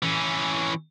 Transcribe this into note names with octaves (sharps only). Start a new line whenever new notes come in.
E3 C#4